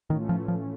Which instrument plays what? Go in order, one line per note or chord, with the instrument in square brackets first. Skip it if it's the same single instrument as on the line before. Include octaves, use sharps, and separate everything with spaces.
[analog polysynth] A2 E3 A3 C#4 F4 [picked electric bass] D#3
[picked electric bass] F3
F3